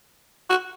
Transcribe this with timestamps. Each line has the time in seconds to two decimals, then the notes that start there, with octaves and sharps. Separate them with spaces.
0.50 F#4